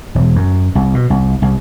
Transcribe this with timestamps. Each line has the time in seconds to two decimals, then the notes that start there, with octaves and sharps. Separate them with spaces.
0.15 E1
0.36 F#2
0.75 C2
0.94 B2
1.10 C2
1.42 C2